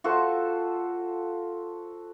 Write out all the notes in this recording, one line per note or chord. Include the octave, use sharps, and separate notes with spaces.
F4 F#4 A4 C5